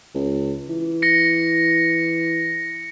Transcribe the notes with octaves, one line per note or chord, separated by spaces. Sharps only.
C#2
E3
A#6 C#7